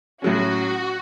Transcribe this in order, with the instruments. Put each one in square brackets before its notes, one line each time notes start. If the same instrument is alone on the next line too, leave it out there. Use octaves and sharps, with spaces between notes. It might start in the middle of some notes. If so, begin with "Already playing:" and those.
[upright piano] A2 F#3 C#4 [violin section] F#4